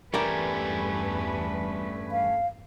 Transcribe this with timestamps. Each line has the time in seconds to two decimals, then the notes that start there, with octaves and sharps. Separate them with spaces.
0.14 E2 G2 G3 A3 C#4 A#4 B4 D5
2.12 F5